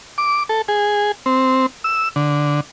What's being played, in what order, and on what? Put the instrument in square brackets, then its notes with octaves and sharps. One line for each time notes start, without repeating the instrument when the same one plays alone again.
[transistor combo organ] D6
A4
G#4
C4
E6
D3